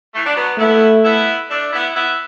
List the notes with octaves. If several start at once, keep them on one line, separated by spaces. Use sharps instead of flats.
E3 A3
D4
F#3 B3
A3 B3 E4
B3 E4
A3 D4
B3 E4
B3 E4